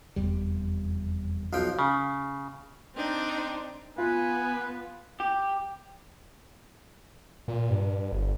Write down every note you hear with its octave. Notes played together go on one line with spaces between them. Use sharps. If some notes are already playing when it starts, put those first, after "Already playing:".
F1 E2 G3
B1 F3 G5
C#3
C4 D4 D#4
B3 F4 B4 G#5
G4
A#2
G2
G1